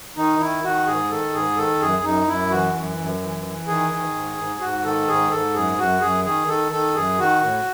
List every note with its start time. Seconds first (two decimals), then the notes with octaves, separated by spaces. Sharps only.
0.17 D#3 D#4
0.40 D#3 E4
0.64 D#3 F#4
0.86 G#2 G#4
1.11 D#3 A4
1.34 G#2 G#4
1.57 D#3 A4
1.80 F#2 G#4
2.03 F#2 D#4
2.27 F#2 E4
2.50 E3 F#4
2.75 F#2
2.98 F#2
3.21 E3
3.45 E3
3.67 D#3 G#4
3.91 D#3
4.15 G#2
4.38 G#2
4.61 G#2 F#4
4.84 D#3 A4
5.08 G#2 G#4
5.31 G#2 A4
5.54 F#2 G#4
5.78 F#2 F#4
6.01 F#2 G#4
6.25 D#3 G#4
6.48 D#3 A4
6.72 D#3 A4
6.94 F#2 G#4
7.18 D#3 F#4
7.41 A2